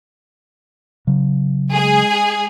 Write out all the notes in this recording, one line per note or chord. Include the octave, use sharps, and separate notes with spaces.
C#3 F#3
G#3 G#4 G#5